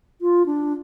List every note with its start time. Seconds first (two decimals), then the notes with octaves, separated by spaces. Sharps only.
0.21 F4
0.46 D4